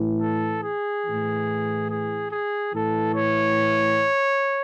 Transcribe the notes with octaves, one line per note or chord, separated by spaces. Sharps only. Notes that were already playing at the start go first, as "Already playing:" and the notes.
Already playing: A2 E3
A4
G#4
A2 E3
G#4
G#4
A2 E3 A4
C#5